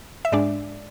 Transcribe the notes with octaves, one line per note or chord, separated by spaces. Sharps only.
E5
G#2 G#3 D4 D5